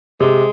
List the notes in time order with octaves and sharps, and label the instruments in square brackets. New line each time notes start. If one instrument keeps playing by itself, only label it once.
[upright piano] C3 [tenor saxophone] G#3